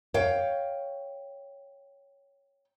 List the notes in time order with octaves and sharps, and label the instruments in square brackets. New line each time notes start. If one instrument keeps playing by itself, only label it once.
[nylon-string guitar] C#5 F5 G5